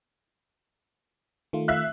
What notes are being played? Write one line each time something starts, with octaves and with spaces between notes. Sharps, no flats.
D#3 A3 F4
E5 F5 F#6